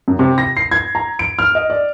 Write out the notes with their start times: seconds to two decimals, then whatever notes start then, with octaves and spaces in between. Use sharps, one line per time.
0.08 F#2
0.19 C3
0.38 A#6
0.57 C7
0.71 G#6
0.95 A#5
1.19 D7
1.39 F6
1.55 D#5
1.70 D5